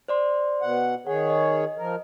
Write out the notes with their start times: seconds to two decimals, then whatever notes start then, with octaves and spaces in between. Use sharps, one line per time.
0.08 C5 D5 C6
0.62 B2 F#5
1.07 D#3 G#4 C#5 F#5
1.30 D#5
1.78 F3 A#4